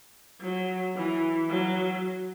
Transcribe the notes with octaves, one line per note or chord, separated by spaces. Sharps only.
F#3
E3
F#3